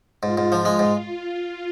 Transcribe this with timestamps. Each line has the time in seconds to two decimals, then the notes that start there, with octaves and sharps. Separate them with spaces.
0.23 G#2 F4
0.38 G#2
0.52 F3
0.65 G#3
0.79 G#2